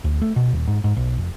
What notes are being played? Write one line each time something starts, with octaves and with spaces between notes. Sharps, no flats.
D2
A3
B2
D#1
G#2
G#2
B1
F1